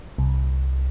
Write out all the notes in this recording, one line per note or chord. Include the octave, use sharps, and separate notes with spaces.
C2